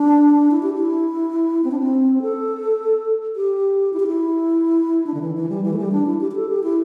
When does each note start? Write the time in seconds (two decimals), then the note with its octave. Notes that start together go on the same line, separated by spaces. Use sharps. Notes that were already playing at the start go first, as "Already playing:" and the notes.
Already playing: D4
0.51 E4
0.63 G4
0.74 E4
1.64 C4
1.71 D4
1.80 C4
2.22 A4
3.36 G4
3.93 E4
4.00 G4
4.07 E4
5.07 D4
5.14 D3
5.21 E3
5.35 E3
5.49 G3
5.63 E3
5.73 A3
5.78 G3
5.92 D4
6.07 E4
6.21 G4
6.31 G4
6.36 A4
6.49 G4
6.63 E4